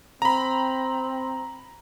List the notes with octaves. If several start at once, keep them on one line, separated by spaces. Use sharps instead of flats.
C4 A#5 B5